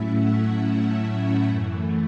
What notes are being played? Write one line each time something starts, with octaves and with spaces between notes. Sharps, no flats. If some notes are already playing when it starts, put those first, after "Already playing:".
Already playing: A2 F#3 A3 C#4 E4 E5
F#5
F#2 E3 A3